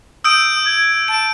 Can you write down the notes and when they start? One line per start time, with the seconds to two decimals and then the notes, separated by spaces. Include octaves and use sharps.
0.24 D#6 E6 G6 D7
0.66 G#6
1.08 A5 D7